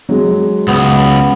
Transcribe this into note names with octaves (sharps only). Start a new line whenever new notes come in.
F#3 G#3
C#2 B3